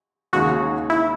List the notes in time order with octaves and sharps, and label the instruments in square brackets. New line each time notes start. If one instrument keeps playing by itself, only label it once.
[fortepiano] D#2 C#3 G#3 D#4 [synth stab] F#4
[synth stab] E4